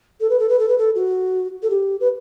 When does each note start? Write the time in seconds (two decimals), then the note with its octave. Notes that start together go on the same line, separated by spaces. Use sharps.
0.20 A4
0.30 B4
0.39 A4
0.49 B4
0.59 A4
0.69 B4
0.78 A4
0.95 F#4
1.62 A4
1.70 G4
2.00 B4